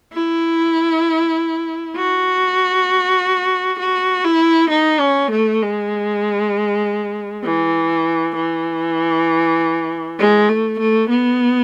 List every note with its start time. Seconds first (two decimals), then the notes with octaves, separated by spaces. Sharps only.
0.13 E4
1.97 F#4
3.79 F#4
4.25 E4
4.70 D#4
5.00 C#4
5.31 A3
5.62 G#3
7.44 E3
8.36 E3
10.19 G#3
10.49 A3
10.80 A3
11.10 B3